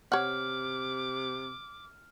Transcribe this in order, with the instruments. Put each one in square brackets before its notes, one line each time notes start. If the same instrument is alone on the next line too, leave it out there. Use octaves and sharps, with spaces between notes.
[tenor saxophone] C3 [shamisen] C#5 F#5 [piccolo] D6 [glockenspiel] F6